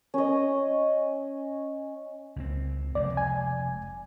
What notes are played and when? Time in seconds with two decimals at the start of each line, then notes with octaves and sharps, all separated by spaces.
0.14 C#4 D#5
2.36 C#2 F#3 C4
2.95 F1 G#3 D5
3.17 G#5